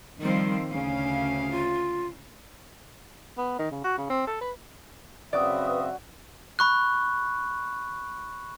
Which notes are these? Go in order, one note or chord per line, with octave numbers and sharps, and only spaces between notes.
D#3 F3 G3 C4
D2 C#3 C#4 F5
F4
B3
D#3
C#3
F#4
C#3
C4
A4
B4
F#2 C#3 C4 F#4 B4 D5 E5 D#6
B5 C#6 F#6